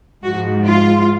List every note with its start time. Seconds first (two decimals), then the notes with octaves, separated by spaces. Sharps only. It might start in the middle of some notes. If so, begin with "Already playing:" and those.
0.23 G#2 F3 F#4
0.65 F4